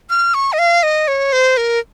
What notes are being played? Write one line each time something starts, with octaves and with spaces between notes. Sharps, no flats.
F6
C#6
D#5
F5
D#5
C#5
C5
A#4